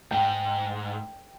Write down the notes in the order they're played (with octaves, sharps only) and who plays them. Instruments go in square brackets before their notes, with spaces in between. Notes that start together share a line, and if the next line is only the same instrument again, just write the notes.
[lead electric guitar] G#2 [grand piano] G5